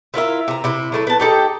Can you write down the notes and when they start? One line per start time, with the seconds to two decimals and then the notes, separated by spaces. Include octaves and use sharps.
0.14 E4 F4 A#4 E5
0.48 C3 A#5
0.64 C3 E4
0.92 F#3 A3 E4
1.07 B3 A5
1.20 D#4 G4 A4